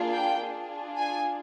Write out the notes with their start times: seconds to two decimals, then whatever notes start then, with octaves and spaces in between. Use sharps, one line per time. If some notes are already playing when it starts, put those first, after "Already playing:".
Already playing: A#3 D4 F4 G#4
0.13 G5
0.40 D4 F4 G#4
0.97 G#5